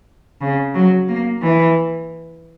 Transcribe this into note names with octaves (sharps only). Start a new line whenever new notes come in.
C#3
F#3
A#3
E3